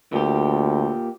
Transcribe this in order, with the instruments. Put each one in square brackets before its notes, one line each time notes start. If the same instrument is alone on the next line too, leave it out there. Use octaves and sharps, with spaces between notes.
[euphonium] D2 [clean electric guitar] A#2 G4